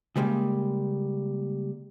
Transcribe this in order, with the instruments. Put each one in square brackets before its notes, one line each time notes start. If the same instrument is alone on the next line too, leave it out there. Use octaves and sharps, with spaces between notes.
[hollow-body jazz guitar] C#3 G3 G#3 A#3